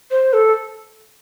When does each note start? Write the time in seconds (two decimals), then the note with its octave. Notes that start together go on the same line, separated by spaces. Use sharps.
0.11 C5
0.33 A4